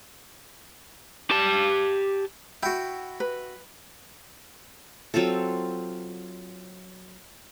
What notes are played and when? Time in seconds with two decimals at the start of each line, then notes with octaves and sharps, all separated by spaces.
1.31 G4 A5
2.63 E4 F#4 G5
3.20 B4
5.14 F#3 C4 F4 A4